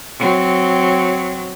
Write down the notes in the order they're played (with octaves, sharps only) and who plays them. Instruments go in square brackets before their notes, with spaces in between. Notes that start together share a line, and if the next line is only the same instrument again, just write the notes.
[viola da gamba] F#3 C4